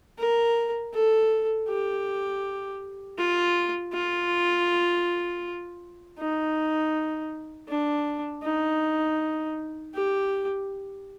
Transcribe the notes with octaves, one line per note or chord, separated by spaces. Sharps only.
A#4
A4
G4
F4
F4
D#4
D4
D#4
G4